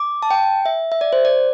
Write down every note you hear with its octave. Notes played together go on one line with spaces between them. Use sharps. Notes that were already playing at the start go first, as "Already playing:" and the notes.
Already playing: D6
A5
G5
E5
E5
D5
C5
D5